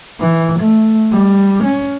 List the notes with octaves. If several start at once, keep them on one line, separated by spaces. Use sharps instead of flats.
E3
A3
G3
C#4